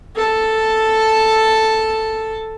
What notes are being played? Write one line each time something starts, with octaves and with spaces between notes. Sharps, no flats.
A4 A5